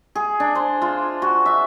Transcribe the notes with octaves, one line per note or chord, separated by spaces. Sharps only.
G#4
D4
C5
F4
F#4
E5